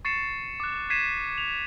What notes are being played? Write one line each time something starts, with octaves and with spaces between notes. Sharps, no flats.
C#6 A6 C7 C#7 E7
D6 F#6
G#6 B6 C7 D#7 E7
F7